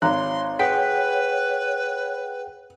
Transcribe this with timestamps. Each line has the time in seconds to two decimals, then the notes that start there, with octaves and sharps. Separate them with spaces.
0.02 G#1 C#5 A#5 C6 F#6
0.59 G#4 B4 F#5 G5 B6